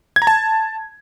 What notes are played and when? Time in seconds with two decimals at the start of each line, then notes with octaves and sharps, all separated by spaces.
0.16 G#6
0.22 A#5
0.27 A5